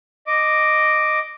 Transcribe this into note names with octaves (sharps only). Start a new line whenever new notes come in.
D#5 D6